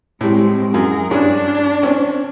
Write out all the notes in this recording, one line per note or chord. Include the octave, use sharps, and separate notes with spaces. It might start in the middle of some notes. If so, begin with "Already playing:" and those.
A2 G3 G#3 C4
F#2 G#4 A#4
G2 C#4 D4
C4 C#4